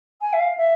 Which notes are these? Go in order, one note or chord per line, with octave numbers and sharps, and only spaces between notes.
G#5
E5
F5
E5